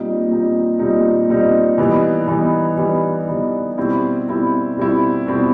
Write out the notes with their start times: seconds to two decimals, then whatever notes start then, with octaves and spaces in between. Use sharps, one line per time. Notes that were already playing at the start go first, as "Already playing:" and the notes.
Already playing: A#2 G3 C4 D#4
0.29 A#2 G3 C4 D#4
0.79 A#2 G3 C4 D#4
1.28 A#2 G3 C4 D#4
1.78 E3 G3 B3 D#4
2.28 E3 G3 B3 D#4
2.77 E3 G3 B3 D#4
3.27 E3 G3 B3 D#4
3.78 B2 G3 C4 E4
4.27 B2 G3 C4 E4
4.77 B2 G3 C4 E4
5.26 B2 G3 C4 E4